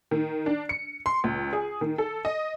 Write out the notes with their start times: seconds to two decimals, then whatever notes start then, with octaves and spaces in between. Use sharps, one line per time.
0.11 D#3
0.46 D4
0.69 C#7
1.06 C6
1.24 C#2
1.53 G#4
1.81 D#3
1.98 A4
2.25 D#5